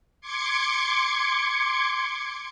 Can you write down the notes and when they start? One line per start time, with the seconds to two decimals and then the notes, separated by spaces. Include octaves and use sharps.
0.21 C6 D6 G#6 C#7